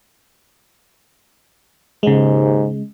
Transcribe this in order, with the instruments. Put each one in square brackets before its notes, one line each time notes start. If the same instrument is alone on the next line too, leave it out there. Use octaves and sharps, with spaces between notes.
[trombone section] D#2 G#2 [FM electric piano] C#3 G#3